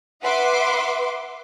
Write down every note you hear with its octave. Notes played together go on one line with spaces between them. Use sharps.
B4 E5 F#5 C6 D6